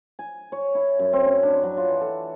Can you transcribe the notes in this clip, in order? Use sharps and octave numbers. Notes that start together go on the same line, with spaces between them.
G#5
C#5
E4
F#2
C4
C#4
D4
F#3
F4
E3
A4